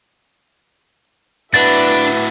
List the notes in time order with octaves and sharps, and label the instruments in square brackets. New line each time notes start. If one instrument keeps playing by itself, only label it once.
[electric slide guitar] A2 E4 F#4 [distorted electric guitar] D4 [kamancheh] B4 E5 [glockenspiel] A6